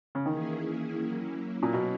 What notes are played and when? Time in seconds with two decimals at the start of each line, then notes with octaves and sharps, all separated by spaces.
0.15 C#3
0.26 D#3 E3 A#3 C#4 E4 G#4
0.99 F#3 A#3 C#4 E4
1.63 A#2
1.73 B2